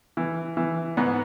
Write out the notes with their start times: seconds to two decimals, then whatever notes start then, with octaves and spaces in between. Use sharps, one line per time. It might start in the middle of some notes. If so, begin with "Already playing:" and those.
0.17 E3
0.57 E3
0.97 G#2 B3